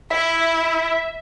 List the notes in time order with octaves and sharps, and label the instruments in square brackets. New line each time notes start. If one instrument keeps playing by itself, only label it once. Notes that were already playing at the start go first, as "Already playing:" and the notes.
[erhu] E4 [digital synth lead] E5